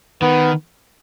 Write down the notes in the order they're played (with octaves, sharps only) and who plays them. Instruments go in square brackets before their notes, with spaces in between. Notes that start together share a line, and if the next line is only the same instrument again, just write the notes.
[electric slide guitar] D#3 [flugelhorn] B3